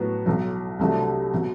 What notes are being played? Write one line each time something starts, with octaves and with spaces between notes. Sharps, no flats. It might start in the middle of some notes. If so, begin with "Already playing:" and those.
Already playing: A2 F#3 B3 F#4
B1 B2 F#3
C2 C3 F#3 A3 D4
B2 F#3